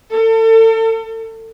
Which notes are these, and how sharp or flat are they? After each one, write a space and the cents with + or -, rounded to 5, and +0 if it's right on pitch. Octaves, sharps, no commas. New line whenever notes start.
A4 +35